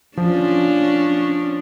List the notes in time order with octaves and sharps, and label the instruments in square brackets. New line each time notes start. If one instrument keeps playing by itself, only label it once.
[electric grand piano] F3 [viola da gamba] C#4 D4